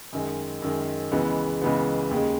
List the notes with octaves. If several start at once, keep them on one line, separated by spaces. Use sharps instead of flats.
F#2 D#3 G#3
F#2 D#3 G#3
C#2 C#3 E3 G#3 B3
C#2 C#3 E3 G#3 B3
D#2 C#3 G#3